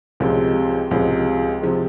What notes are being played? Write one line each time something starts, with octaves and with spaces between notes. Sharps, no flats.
C#2 C3 F3 G#3
C#2 C3 F3 G#3
C3 F3 G#3